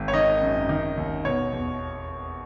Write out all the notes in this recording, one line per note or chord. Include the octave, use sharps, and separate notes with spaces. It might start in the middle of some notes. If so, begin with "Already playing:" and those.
Already playing: G#1
C#5
D#3 D#5
F#2
D#3
D#2
B2 C#5
E2